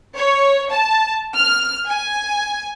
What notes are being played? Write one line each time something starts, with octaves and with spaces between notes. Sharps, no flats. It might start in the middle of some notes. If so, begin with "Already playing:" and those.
C#5
A5
F6
G#5